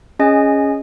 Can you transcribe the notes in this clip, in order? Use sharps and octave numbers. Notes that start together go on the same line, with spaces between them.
C#4 G#4 D#5 G#5